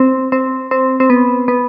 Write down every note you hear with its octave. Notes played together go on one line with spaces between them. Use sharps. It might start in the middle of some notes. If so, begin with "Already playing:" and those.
Already playing: C4
C4
C4
C4
B3
B3